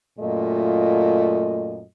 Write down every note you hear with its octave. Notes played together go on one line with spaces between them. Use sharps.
F#2 A#2 A3 F4 D#5